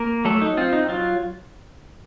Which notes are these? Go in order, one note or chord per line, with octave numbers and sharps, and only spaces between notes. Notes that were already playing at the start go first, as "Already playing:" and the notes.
Already playing: A#3 A#4
F#3 A3 A4
D#4
C4 F4
D#4
F#3 F4